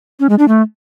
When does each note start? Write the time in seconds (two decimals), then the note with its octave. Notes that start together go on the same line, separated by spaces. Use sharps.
0.20 C#4
0.29 G#3
0.39 D4
0.48 A3